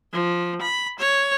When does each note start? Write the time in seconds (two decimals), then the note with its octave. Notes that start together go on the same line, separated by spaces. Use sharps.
0.13 F3
0.61 B5
0.99 C#5